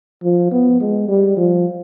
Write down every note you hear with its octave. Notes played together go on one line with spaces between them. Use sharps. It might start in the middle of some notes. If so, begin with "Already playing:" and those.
F3
B3
G#3
G3
F3